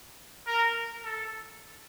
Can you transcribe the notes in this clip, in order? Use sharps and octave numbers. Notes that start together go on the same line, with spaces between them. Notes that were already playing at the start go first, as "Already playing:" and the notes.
A#4
A4